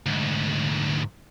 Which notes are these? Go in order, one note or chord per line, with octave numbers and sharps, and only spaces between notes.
D2 G#2